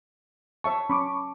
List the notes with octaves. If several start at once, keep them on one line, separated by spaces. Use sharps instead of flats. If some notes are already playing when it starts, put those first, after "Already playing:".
C#5 E5 A5 C#6
C#4 B5 C#6 D6